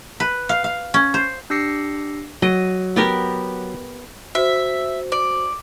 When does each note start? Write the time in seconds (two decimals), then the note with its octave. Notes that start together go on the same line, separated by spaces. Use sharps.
0.20 B4
0.49 F5
0.64 F5
0.94 C#4
1.14 C5
1.50 D4 G4 E6 A#6 C7 C#7
2.42 F#3 D#5
2.96 B3 G4 A#4
4.35 F#4 C5 E5
5.12 D5